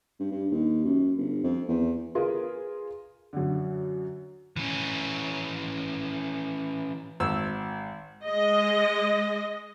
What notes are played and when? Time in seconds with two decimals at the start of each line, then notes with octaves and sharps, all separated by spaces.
0.20 G2
0.31 G2
0.51 D#2
0.84 F#2
1.18 G1
1.44 F2
1.68 E2
2.15 F4 G#4 A#4 B4
3.33 F#2 D3
4.57 E3 C#4
7.20 G#1 E6
8.24 G#3 D#5